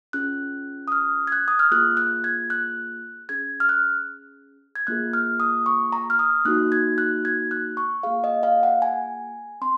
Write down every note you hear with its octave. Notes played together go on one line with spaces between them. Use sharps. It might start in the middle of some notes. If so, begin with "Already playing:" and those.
C#4 F4 G#4 F#6
D#6
F6
G#6
F#6
D#6
F6
A#3 F4 G#4 F#6
F#6
G#6
F#6
C#4 G#4 G#6
F6
F#6
G#6
A#3 F4 G#4 F#6
F6
D#6
C#6
A#5
F6
D#6
A#3 D#4 F#4 F#6
G#6
F#6
G#6
F#6
C#6
A#3 F4 G#4 F5
D#5
F5
F#5
G#5
C4 C6